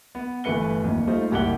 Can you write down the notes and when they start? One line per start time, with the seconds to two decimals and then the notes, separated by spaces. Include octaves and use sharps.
0.15 B3
0.44 G1 E3 A3 B4 C#7 G7
0.83 D#1 F2
1.07 G3 A3 D#4 F4 C5
1.31 F#1 C2 G4 F#5 F#6 G7